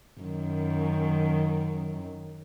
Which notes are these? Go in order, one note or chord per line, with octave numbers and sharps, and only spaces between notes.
F#2 D#3